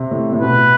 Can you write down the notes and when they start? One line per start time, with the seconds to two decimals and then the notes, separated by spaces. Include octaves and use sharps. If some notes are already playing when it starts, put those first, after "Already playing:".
Already playing: C3
0.11 A2
0.33 A2
0.41 B2 B4